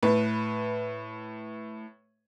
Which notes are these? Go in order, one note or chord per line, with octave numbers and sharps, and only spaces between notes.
A2 B4